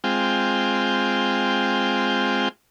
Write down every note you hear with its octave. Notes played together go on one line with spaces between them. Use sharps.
G#3 C4 F4 G5